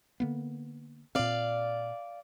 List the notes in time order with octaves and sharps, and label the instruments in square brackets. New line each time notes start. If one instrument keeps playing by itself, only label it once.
[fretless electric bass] D3 A#3 B3
[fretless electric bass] A#2 C4 [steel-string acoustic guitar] D5 F5